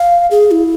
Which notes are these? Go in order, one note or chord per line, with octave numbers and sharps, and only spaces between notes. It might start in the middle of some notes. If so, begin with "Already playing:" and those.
Already playing: F5
G#4
E4